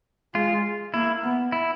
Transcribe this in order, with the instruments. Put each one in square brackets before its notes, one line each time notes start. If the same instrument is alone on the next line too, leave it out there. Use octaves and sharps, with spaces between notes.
[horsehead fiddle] G#3 [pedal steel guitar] F4
[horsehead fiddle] A#3 [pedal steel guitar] E4
[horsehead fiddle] B3
[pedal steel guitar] E4